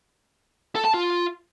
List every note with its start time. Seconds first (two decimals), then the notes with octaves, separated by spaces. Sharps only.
0.75 A4
0.85 A5
0.94 F4